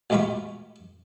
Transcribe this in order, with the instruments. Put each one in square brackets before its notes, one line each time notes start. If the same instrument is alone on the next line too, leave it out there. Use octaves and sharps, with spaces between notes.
[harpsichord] A1 D2 G#3 F4 B5 C#6